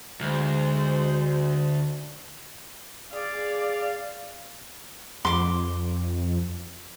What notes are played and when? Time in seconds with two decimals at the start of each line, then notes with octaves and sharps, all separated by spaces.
0.21 D2 G#3 C5
3.13 G#4 D5 F5
5.25 F2 C6 D6